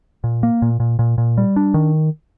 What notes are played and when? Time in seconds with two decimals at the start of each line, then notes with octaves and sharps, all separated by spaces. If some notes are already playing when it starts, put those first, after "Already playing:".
0.24 A#2
0.43 A#3
0.62 A#2
0.80 A#2
0.99 A#2
1.18 A#2
1.38 G3
1.56 D4
1.74 D#3